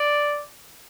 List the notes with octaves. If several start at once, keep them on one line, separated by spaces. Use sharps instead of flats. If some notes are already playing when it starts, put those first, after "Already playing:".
Already playing: D5